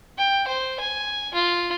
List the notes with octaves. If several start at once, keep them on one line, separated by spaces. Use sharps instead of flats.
G5
C5
G#5
F4